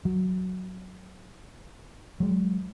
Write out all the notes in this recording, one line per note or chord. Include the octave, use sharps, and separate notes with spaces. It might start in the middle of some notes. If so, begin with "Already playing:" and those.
F#3
F#3 G#3